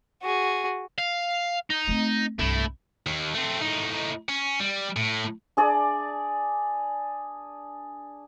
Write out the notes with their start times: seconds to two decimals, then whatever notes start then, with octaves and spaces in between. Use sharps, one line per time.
0.23 F#4 G#4
0.98 F5
1.70 D#4
1.88 A3 C4
2.39 C2 G2 A3 E4
3.06 D#2
3.35 A3 C4
3.61 A2 D#4
4.29 C#4
4.60 G3
4.96 A2
5.57 D4 G#4 D5